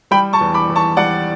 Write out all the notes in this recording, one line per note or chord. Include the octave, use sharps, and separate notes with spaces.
G3 G5 B5
A5 C#6
E2
B5 D6
E2
A5 C#6
G3 D5 F#5